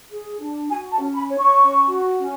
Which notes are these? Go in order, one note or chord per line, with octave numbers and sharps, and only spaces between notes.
G#4
D4
F#4 G#5
A5
C#4
B5
C#5
C#6
C#4
F#4
C#4